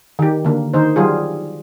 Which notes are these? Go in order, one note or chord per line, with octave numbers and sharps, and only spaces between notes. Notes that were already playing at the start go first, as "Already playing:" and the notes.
D#3 G4
D3 A#3
D#3 D#4 C5
F#3 G3 F4 G#4